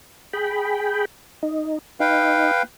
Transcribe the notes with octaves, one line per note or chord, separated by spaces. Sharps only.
G#4 G5 B5
D#4
D#4 B4 F5 G5